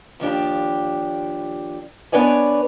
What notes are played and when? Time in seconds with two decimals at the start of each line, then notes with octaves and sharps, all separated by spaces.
0.20 D#2 F3 D4 G4
2.12 B3 D4 B4 C#5 D5 G#5